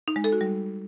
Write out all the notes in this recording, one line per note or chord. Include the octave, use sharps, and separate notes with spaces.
D#4
G#3
A4
F#4
G3